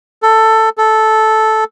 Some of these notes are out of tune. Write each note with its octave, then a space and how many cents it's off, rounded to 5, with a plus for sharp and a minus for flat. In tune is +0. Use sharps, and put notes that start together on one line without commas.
A4 +10
A4 -10